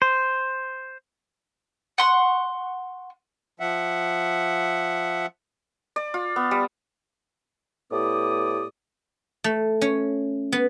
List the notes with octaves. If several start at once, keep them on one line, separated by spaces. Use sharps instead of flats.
C5
F#5 C6 C#6
F3 E5 F#5
D5
F4
B3
G3
A2 B3 E4 G4 D5 D#6
A3
C#4
B3